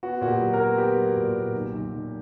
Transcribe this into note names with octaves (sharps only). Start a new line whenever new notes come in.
B3 F#4
A#2 F#4
G4
F#3
A#4
B3
B3 G4
F#3
A#2
A#2
B1
B1
B1